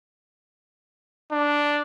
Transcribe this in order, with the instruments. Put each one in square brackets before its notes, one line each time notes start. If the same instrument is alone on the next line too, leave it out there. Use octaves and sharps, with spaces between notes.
[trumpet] D4